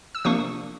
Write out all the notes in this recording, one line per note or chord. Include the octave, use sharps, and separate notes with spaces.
E6
C3 F3 A#3 D4 C#6 D#6